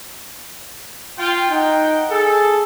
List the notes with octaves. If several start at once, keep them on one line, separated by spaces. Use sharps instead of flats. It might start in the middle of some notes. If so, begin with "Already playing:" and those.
F4 G5
D#4 F#5 G5
G#4 A4